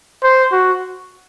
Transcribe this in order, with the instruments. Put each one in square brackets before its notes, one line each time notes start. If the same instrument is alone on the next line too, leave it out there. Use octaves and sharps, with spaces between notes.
[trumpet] C5
F#4